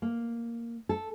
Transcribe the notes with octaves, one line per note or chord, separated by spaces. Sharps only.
A#3
A4